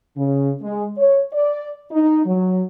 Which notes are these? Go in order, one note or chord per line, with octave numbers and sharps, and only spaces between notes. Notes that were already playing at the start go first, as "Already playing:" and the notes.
C#3
G#3
C#5
D5
D#4
F#3